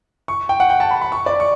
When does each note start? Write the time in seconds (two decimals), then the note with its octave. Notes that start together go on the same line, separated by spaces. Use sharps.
0.28 C#6
0.49 G5
0.60 F#5
0.70 G5
0.80 A5
0.91 B5
1.01 B5
1.12 C#6
1.26 D5
1.40 C#6